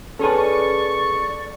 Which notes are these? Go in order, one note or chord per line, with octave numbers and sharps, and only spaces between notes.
C#4 G#4 A4 B4 D5 A5 C#6